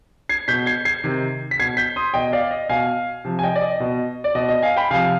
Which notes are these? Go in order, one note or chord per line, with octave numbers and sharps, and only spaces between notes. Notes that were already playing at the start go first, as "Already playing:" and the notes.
G#6 C7
B2 G6 B6
G#6 C7
G#6 C7
C3 D#3
B6
B2 G#6 C7
G6 B6
C6 D#6
B2 D#5 G5
D5 F5
D#5
B2 F5 G#5
C3 F3
G#5
D#5 G5
D5
D#5
B2
D5
B2 D#5
D#5
F5 G#5
G5 B5
C3 F3 F5 G#5